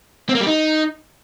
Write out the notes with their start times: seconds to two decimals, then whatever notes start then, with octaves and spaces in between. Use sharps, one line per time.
0.29 C4
0.35 A#3
0.41 G3
0.46 D#4